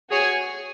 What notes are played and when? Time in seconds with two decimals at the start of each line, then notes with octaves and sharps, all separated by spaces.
0.10 F#4 G#4 C#5 G#5